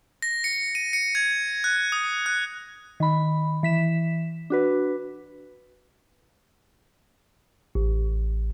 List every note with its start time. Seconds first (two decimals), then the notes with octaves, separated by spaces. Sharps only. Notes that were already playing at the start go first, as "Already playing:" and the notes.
0.22 A#6
0.44 C#7
0.75 D#7
0.93 C#7
1.15 G#6
1.64 F#6
1.92 D#6
2.26 F#6
3.00 D#3 B5
3.63 E3 B6 E7
4.50 D4 F#4 B4
7.75 A1